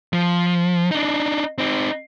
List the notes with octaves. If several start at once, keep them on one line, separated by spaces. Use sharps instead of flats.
F3
D4 D#4
C4 D#4